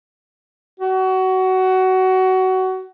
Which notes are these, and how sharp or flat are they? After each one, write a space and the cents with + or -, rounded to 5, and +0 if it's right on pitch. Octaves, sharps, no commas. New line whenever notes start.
F#4 +20